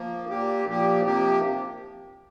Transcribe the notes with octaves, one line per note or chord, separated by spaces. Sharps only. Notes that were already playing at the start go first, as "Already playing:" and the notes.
Already playing: F3 A#3
A#2 A#3 G4
A#2 F3 A#3 G4
C3 F3 A#3 G4